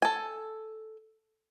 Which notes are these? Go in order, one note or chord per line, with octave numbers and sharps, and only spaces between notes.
A4 G#5